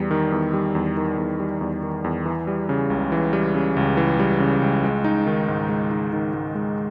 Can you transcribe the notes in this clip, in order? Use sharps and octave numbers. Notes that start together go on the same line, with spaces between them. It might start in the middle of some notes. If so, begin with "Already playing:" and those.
Already playing: E2 G3
D#3
E2
G3
E2
D#3
E2
G3
E2
D#3
E2
E3
G3
C#3
C#2
E3
G3
C#3
C#2
E3
G3
C#3
C#2
G#3
D#4
D#3
G#2
G#3
D#4
D#3
G#2
G#3